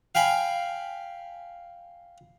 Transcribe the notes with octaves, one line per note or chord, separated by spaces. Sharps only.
F5 G5 G#5 B5